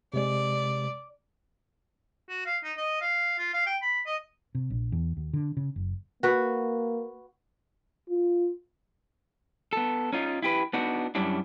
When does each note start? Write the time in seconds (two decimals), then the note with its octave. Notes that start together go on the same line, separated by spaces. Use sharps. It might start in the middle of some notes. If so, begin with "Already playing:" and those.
0.14 C3 G#3 D5
2.29 F#4
2.46 F5
2.64 D#4
2.77 D#5
3.01 F5
3.38 F4
3.54 F5
3.66 G5
3.82 B5
4.06 D#5
4.55 C3
4.70 A#1
4.92 E2
5.17 D#2
5.33 D3
5.57 C#3
5.76 F#1
6.23 A#3 F#4 B4
8.10 F4
9.73 B3 A4
10.13 C#4 D#4 F4
10.43 E4 G4 B4
10.73 B3 D4 D#4 F#4
11.15 F#2 G3 C#4 D4 E4